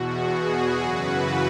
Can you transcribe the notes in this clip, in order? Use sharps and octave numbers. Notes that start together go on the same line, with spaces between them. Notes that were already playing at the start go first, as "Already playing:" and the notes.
Already playing: E2 B2 F#4
G#4
F#2 C#3 E3 F#4 B4